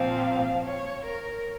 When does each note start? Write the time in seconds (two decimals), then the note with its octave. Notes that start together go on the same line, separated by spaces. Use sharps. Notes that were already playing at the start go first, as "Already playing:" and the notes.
Already playing: A#2 F3 C4 F5
0.64 C#5
1.06 A#4